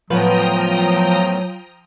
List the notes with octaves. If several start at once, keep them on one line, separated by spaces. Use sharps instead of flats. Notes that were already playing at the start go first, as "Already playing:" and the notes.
A2 F3 F#3 B3 B4 G5 A#5 D#6